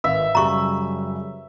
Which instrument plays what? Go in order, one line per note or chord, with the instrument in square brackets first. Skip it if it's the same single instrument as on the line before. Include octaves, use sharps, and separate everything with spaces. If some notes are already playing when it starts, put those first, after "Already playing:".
[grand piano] G#1 F5 [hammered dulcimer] E5
[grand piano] F#2 C#3 G3 [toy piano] A#5 C#6